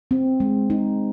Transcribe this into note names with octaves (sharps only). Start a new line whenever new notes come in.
C4
G#3
D#4